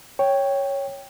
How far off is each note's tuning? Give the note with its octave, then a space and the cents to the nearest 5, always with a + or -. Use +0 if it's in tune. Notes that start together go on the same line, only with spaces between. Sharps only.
C#5 +0 G5 +0